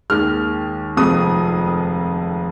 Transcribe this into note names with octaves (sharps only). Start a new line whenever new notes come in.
D#2 D#3 G#3 F6
F1 F2 F3 G#3 D#6